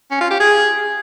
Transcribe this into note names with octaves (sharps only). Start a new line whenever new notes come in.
C#4
F4
G4
G#4